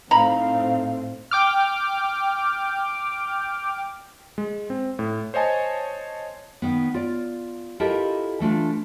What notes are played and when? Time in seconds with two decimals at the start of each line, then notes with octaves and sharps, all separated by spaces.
0.11 A2 A3 C4 D#4 F5 A#5 B5
1.31 G5 D6 F6
4.38 G#3
4.70 C4
4.99 A2
5.34 C5 C#5 D#5 G#5 A5
6.62 D#3 B3
6.94 F4 D5
7.80 E4 F4 G4 A4 A#4 D#5
8.40 E3 A3 D4 F4